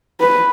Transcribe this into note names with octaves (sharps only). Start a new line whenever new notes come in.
B4